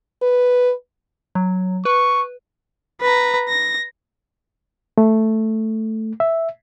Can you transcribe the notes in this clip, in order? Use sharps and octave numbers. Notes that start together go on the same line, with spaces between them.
B4
F#3
B4 C#6
B4 A#5
A#6
A3
E5